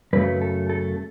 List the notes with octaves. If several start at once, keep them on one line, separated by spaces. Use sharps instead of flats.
F#2 C#3 F#3 A3 B4
A4
A4